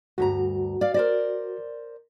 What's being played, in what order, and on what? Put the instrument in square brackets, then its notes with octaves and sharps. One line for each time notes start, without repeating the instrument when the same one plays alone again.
[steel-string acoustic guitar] D2 G2 A#5 [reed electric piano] F#4
[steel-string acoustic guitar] D5 F5
A#4 C5 D5